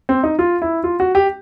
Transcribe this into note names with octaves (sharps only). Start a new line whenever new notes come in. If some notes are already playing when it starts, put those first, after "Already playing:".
C4
D#4
F4
E4
F4
F#4
G4